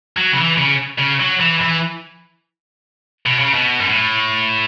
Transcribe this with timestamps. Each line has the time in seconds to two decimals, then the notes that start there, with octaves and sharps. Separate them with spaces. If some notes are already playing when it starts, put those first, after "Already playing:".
0.17 F#3
0.32 C#3
0.37 E3
0.58 C#3
0.99 C#3
1.20 F#3
1.40 E3
1.61 E3
3.26 B2
3.40 C#3
3.54 B2
3.80 F#2
3.88 A2